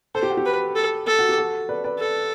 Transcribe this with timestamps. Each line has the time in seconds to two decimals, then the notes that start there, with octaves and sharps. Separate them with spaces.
0.15 A4 C5
0.23 G4
0.30 F#4
0.37 G4
0.46 B4
0.76 A4
1.07 A4
1.19 F#4
1.29 G4
1.38 F#4 A4
1.69 B4 D5
1.84 B4 D5
1.99 A4